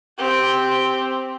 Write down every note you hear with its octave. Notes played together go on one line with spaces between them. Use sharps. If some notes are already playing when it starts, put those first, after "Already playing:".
C4 G4